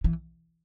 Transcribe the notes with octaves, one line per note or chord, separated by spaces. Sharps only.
E3